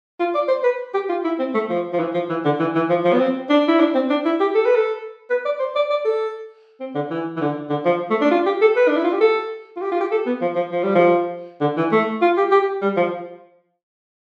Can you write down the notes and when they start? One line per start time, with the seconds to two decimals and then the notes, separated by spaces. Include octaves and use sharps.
0.19 F4
0.35 D5
0.48 C5
0.64 B4
0.94 G4
1.09 F4
1.25 E4
1.39 C4
1.54 A3
1.70 F3
1.93 F3
2.00 E3
2.14 F3
2.29 E3
2.45 D3
2.59 E3
2.75 E3
2.89 F3
3.05 F3
3.13 B3
3.19 C4
3.50 D4
3.68 E4
3.80 D4
3.95 C4
4.10 D4
4.25 E4
4.40 G4
4.55 A4
4.66 B4
4.76 A4
5.30 B4
5.45 D5
5.59 C5
5.76 D5
5.90 D5
6.05 A4
6.80 C4
6.95 D3
7.11 E3
7.37 E3
7.41 D3
7.70 D3
7.85 F3
8.10 A3
8.21 D4
8.31 F4
8.46 G4
8.61 A4
8.76 B4
8.88 D4
8.97 E4
9.04 F4
9.13 G4
9.21 A4
9.77 F4
9.82 G4
9.91 F4
10.00 G4
10.12 A4
10.26 B3
10.41 F3
10.56 F3
10.72 F3
10.83 G3
10.95 F3
11.61 D3
11.77 E3
11.92 A3
12.22 F4
12.37 G4
12.52 G4
12.82 G3
12.97 F3